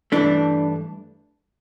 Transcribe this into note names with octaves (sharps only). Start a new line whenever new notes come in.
G2 E3 A3 D4